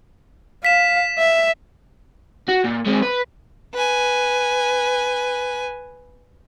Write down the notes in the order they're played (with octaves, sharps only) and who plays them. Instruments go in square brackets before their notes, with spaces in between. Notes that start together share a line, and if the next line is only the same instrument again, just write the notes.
[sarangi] F5 [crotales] B6 E7
[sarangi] E5
[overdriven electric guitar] F#4
A#2
G#3 C4
B4
[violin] B4 G#5